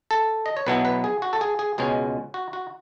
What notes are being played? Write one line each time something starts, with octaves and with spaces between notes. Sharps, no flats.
A4
D#5
C#5
B1 B2 F#3 B3 E4 B4
B4
G#4
F#4
A4
G#4
G#4
C#2 B2 G#3 C#4 G#4
F#4
F#4